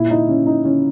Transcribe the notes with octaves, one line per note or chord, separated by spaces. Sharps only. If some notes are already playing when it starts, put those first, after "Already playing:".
Already playing: A#2 E4
D#4
C#4
D#4
C#4